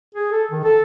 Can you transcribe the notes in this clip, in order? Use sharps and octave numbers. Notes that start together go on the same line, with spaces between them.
G#4
A4
D#3
A4